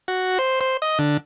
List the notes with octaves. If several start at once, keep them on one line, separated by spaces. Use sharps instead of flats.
F#4
C5
C5
D#5
D3